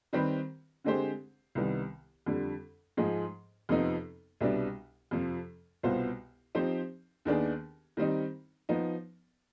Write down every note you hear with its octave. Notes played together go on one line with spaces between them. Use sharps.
D#3 G3 C4 G4 B4
D3 G#3 C4 G4 C5
C2 C3 D#3 G3 B3
F2 D3 G3
G#2 F3 G#3
F2 C3 F3 B3 D#4
C2 B2 G3 B3 D4
F2 C3 F3
C2 B2 B3 F4 C5
F3 C4 D#4 G4 C5
D#2 D#3 B3 D4 G#4
D#3 G3 C4 D#4
F3 B3 D#4